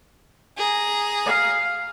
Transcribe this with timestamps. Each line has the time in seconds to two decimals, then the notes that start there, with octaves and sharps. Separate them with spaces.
0.57 G#4 A#5
1.26 F5